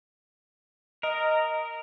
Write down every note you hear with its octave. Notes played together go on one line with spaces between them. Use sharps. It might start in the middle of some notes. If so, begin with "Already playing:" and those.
A#4 D#5